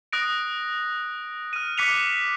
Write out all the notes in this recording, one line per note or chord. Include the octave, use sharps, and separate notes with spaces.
D#6 F#6 A#6 D7
F6 D#7
D6 F#6 B6 C#7 D#7 F7